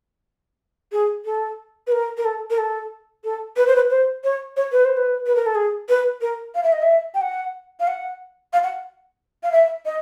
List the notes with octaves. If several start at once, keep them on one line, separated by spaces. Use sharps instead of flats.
G#4
A4
B4
A#4
A#4
A4
A#4
A4
A4
B4
C5
B4
C5
C#5
C#5
B4
C5
B4
B4
A#4
A4
G#4
B4
A#4
F5
E5
D#5
E5
G5
F#5
F5
F#5
F5
F#5
F5
E5
D#5